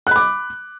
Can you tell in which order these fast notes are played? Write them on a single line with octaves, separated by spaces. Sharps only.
F#6 B5 D6